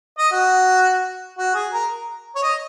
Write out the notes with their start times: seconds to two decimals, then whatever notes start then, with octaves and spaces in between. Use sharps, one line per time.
0.18 D#5
0.32 F#4
1.38 F#4
1.55 G#4
1.73 A#4
2.35 C#5
2.43 D#5